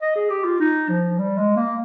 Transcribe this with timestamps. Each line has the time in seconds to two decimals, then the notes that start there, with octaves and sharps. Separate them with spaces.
0.02 D#5
0.16 G#4
0.30 G4
0.44 F4
0.60 D#4
0.89 F3
1.18 G3
1.38 G#3
1.56 A#3